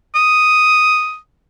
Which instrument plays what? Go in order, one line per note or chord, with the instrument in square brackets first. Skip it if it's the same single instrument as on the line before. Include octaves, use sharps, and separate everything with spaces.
[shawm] D#6